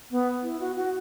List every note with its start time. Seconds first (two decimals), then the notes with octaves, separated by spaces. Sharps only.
0.11 B3
0.43 E4
0.60 F#4
0.76 F#4